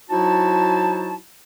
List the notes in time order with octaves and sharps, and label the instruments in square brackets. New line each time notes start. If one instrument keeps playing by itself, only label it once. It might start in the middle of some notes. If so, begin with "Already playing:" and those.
[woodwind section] F#3 D#4 E4 F#4 C5 A5